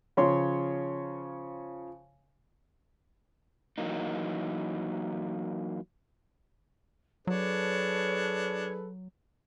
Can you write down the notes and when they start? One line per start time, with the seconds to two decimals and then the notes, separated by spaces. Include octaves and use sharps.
0.17 C#3 F3 C#5 C6
3.78 E3 F#3 A#3 D#4
7.27 F#3 D4 G#4 A4 B4 C#5